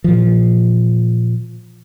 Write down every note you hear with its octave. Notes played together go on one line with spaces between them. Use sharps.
A#2 E3 F3